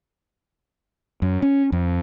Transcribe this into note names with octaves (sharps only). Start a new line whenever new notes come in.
F#2
C#4
F2